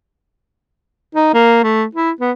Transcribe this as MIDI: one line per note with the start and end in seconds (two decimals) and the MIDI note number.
1.15 1.32 63
1.34 1.61 58
1.64 1.85 57
1.95 2.10 64
2.21 2.31 59